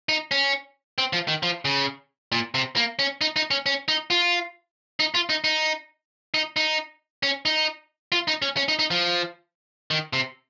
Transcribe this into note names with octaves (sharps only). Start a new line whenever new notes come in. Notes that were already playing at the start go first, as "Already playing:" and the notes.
D#4
C#4
C4
F3
D#3
F3
C#3
A#2
C3
A#3
C#4
D#4
D#4
C#4
C#4
D#4
F4
D#4
F4
D#4
D#4
D#4
D#4
C#4
D#4
F4
D#4
C#4
C#4
D#4
D#4
F3
D#3
C3